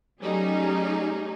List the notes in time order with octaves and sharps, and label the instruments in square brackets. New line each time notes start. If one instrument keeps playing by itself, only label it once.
[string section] F#3 G3 A3 C#4 D#4 G#4